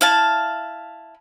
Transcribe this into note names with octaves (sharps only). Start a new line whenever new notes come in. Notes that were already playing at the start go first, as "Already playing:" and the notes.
E4 F5 A5